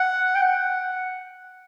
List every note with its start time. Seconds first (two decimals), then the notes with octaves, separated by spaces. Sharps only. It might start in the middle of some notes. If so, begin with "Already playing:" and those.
Already playing: F#5
0.35 G5
0.42 F#5